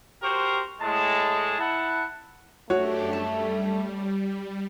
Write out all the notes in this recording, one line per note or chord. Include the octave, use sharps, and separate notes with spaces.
F#4 G4 A#4 C5
A2 G#3 A5
E4 F#5 A5
F#2 A3 D4 F#4 G4 C#5
G3 A5